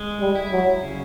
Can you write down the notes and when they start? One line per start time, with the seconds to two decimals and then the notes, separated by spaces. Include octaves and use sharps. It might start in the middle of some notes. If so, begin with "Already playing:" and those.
Already playing: G#3
0.21 G3
0.35 E4
0.52 F#3
0.82 C#3